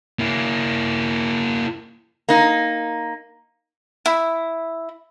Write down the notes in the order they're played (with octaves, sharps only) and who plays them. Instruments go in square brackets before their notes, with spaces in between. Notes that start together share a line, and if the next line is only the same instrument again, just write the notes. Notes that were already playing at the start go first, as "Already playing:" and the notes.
[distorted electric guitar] A#3 E4
[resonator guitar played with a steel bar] A#3 D#4
[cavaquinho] E4